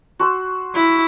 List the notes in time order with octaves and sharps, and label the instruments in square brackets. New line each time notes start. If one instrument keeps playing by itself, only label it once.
[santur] F#4 C6 E6
[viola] E4